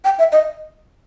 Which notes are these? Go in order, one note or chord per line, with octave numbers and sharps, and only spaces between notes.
G5
E5
D#5